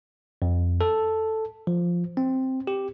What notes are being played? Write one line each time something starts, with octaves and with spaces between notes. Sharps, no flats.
F2
A4
F3
C4
G4